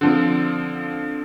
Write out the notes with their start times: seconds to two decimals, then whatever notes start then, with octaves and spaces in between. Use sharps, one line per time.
0.01 D3 F3 C4